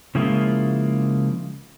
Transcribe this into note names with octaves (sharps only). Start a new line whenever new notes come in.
C#3 F3 G#3 A#3 E4 F4